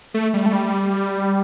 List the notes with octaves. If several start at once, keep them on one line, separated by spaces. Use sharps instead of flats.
A3
G3
A3
G3